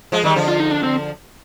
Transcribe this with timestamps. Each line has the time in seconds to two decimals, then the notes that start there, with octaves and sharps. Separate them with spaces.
0.12 F3 G#3
0.24 D#3 G3
0.36 D3 F3
0.48 F4
0.60 D#4
0.71 D4
0.83 C4